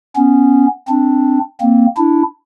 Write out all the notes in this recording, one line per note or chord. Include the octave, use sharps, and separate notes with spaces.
B3 C#4
C4 D4
A#3 C4
D4 E4